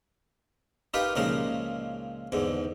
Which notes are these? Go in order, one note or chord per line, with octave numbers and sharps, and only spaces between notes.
D#4 F4 G4 A#4 B4
C#2 A#2 C#3 F3 D#4 A#4
E2 G#2 D3